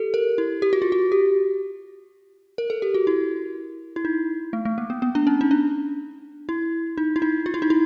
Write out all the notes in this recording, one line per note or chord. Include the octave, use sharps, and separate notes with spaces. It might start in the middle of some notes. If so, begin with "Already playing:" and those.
Already playing: G4 A4
A#4
E4
G4
F#4
F4
F#4
G4
A#4
A4
G4
F#4
E4
E4
D#4
A3
A3
A#3
B3
B3
D4
C#4
D#4
D4
E4
D#4
E4
D#4
F4
E4
D#4
E4